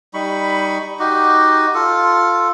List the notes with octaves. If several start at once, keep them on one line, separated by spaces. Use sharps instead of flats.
G3 D#4 B5 C#6
D#4 F#4 G4
F4 A4